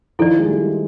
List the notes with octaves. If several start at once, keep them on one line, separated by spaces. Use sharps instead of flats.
D#3 F3 E4 A4 D5
G#3
G3 A3